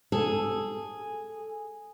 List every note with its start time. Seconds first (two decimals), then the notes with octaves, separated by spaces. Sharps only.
0.12 G#4 A4